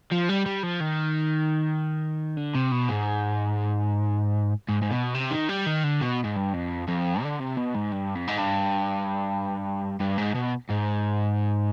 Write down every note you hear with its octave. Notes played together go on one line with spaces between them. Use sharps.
F3
G3
G3
F3
D#3
D3
C3
B2
G#2
G#2
G#2
B2
C3
D#3
G3
D#3
D3
B2
G#2
G2
F2
F2
D3
C3
B2
G#2
G2
F2
G#2
G2
G2
G#2
B2
G#2